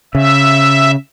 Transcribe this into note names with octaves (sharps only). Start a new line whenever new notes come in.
C#3 E5